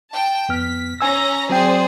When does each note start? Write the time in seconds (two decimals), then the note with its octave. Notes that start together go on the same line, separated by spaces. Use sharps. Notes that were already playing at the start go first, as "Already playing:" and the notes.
0.10 G5 A5
0.49 F2 B3 F6 B6
1.01 C#4 G#5 A#5 E6 A#6
1.49 F#3 C4 G#4 C5 D5 G5